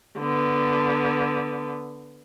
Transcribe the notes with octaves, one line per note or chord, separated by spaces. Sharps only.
D3 B3